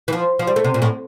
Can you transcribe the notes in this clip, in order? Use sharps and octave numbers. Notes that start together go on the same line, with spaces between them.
E3
F3
F3
G3
A3
C3
A#2
A2